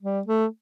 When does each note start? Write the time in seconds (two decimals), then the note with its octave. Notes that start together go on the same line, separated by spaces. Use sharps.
0.02 G3
0.27 A3